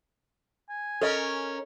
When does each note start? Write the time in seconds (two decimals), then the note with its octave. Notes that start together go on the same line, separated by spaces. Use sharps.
0.70 G#5
1.02 C#4 A4 A#4 D#5